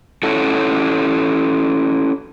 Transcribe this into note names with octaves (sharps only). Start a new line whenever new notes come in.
C#4 E4 F#4 A4